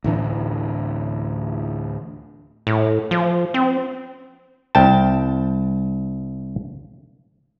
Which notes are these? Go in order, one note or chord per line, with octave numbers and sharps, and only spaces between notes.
D2 A2 E3 D4
A2
F3
C4
C2 G5 A5